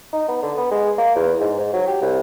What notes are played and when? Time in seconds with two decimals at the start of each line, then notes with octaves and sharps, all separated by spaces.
0.12 D#4
0.28 B3
0.43 D3
0.57 B3
0.71 G#3
0.98 A#3
1.15 E2
1.40 G#2
1.59 G#2
1.73 F#3
1.87 G4
2.01 C2